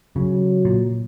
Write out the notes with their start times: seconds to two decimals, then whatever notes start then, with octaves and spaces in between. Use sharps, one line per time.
0.16 C#3 F#3
0.65 A#2